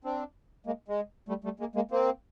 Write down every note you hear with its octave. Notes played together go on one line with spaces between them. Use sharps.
C4 D4
G#3 A#3
G#3
G3 A3
G3 A3
G#3 A#3
G#3 A#3
A#3 C4